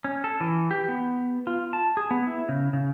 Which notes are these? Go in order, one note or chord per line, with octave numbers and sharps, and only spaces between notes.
C#4
A4
E3
G4
B3
F4
A5
G#4
B3
E4
C#3
C#3